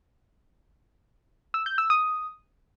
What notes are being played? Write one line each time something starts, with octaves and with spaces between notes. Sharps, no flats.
E6
G6
E6
D#6